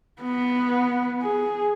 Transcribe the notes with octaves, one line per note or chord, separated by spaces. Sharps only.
B3
G#4